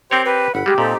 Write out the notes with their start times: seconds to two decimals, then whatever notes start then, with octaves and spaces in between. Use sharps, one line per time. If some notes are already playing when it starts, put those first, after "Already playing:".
0.11 C4 G4 A#4 C5 C#5
0.25 G4 B4
0.55 G1 F#5 B5
0.66 G3 G#3 G4
0.78 A#2 C4 D#4 A4